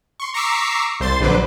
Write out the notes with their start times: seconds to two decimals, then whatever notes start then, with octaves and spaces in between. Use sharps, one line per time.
0.20 C6 C#6
0.34 A#5 C#6 D6 E6 B6 C7
1.00 C2 C5 C6 A6
1.20 A#1 D3 F#3 B4 C5 D6